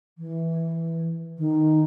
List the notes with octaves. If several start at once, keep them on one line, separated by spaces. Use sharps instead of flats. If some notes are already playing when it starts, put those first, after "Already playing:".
E3
D#3